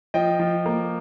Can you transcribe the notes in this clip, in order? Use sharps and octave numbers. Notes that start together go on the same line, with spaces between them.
F3 D#5 G5
F3
A#3